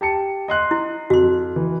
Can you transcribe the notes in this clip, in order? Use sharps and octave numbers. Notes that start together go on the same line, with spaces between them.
G4 A5 C#7
D#5 C6 F#6
E4
F2 F#4 C6
E3